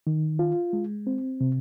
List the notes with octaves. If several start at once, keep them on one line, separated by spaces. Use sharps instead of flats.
D#3
F4
G#3
C4
C3